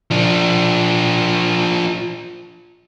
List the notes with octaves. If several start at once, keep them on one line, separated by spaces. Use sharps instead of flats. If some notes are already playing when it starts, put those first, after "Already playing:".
F3 D4